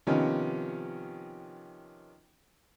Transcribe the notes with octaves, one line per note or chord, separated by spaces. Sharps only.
C3 D#3 F3 B3 C#4 D#4